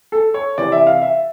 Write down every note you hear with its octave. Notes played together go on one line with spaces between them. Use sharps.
A4
C#5
C3 E3 D5
E5
F5
E5